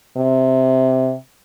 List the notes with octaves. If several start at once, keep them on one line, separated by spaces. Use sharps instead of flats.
C3